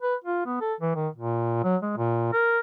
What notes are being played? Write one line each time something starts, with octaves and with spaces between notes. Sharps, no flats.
B4
F4
B3
A4
E3
D#3
A#2
F#3
G#3
A#2
A#4